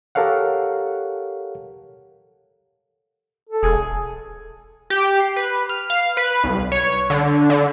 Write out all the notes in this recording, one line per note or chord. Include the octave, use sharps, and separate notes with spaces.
G4 A4 A#4 C#5 F5 F#5
A4
E1 G#4
G4
C7
B4
F6
F5
B4
C2
C#5
D3
D3